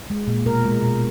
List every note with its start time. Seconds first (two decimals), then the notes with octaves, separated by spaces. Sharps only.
0.10 G#3
0.27 A#2
0.46 B2 A#4
0.65 G#3
0.83 B2